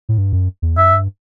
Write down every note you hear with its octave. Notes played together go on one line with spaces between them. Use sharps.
A2
G2
F#2
E2
F#2 E5
G2